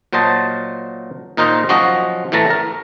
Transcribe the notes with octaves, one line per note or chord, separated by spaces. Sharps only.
A#2 F#3 C5 D#5 A5
A#2 D#4 A#4 C5 D#5
F3 F#3 C#4 F#4 D#5
A2 E3 A3 A5 A#5
A#4